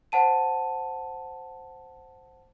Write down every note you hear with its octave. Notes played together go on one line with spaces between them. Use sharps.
C5 F#5 A5 D#7